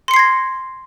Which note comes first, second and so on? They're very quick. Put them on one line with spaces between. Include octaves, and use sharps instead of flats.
C6 C#7 C7 G#6 A#6